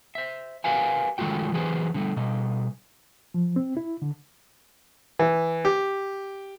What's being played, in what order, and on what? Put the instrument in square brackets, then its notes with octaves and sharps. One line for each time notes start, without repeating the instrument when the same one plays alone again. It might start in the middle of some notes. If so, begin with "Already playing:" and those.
[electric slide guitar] C5 E5
G4 A#4 B4 F5 F#5 G#5
D#3 G#3 A3 F4 F#4 G5
E3 F#3 G4 G#4 B4 C5
D3 G3 A3
B2 G3 D#5
[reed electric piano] F3
C4
E4
D3
[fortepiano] E3
G4